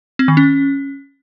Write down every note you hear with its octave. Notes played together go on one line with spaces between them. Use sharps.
C4
D#3
C#4